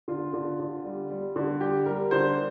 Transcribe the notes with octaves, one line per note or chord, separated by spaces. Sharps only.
D3 F4
D3
D3
G3
G3
D3
G3 G4
G3 A#4
D3 C5